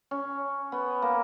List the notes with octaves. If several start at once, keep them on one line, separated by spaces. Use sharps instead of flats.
C#4
B3
A#3